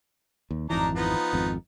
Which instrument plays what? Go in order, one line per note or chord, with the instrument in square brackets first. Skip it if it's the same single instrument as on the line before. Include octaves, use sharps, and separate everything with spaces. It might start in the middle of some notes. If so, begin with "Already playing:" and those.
[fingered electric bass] D#2
[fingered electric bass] G#1 F2 E3 [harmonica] D4 D#4 A#5
[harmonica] F3 B3 D#4
[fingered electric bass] G#1 F2